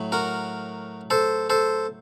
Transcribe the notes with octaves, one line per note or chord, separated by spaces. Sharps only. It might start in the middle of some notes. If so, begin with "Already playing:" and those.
Already playing: A2 F#3
F#4 A#4
A4 C5
A4 C5